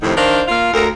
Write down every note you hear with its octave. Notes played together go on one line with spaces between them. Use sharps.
F2 A2 C3 D#3
D#3 D4 C5 F5
A#3 F4 F5
D2 A#4